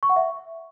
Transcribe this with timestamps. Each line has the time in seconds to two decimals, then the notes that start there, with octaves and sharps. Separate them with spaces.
0.03 C#6
0.09 F#5
0.16 E5